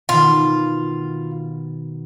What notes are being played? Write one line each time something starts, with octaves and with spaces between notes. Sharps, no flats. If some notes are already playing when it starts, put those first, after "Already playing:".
B2 D#3 F4